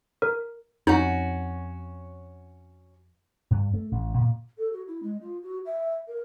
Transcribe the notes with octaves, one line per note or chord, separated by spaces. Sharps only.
A#4
F2 C#4 D#4 F#4
G2
A3
A1
A#2
A4
F#4
E4
G#3
F4
F#4
E5
A#4